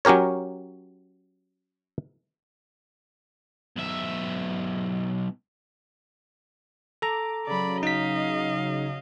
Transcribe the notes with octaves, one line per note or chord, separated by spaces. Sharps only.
F#3 C#4 G4 A#4 C#5
B1 E5
A4 A#5 D6
C#3 F#3 D5 B5
D#4 D#5 F5 B6